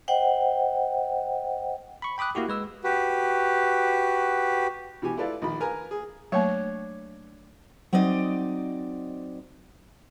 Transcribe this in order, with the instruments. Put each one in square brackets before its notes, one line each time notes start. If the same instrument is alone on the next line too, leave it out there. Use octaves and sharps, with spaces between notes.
[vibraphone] C5 D#5 F#5 G5
[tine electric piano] B5 C#6
G5 B5 D6 D#6 F#6
A#3 E4 F#4 G4
G#3 B4 E6
[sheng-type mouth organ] F#4 G4 B4
[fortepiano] B2 E3 G4 G#5
E4 F4 A4 B4 D5 F5
A#1 D#3 B5
A#4 B4 G#5 A#5
G#4
[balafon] F#3 A3 A#3 [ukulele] D4 C#5
[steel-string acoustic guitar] F#3 C4 D#4 D5 D#5